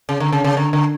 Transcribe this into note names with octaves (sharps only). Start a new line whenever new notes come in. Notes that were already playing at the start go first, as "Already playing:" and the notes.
C#3
D3
C#3
C#3
D3
D3